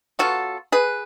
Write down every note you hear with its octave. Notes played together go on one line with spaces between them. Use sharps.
F#3 B3 F4 F#4 A4
G#4 B4